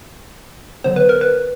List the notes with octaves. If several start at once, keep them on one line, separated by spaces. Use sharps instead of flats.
D3 F#3 B3 C5
B4
A#4
B4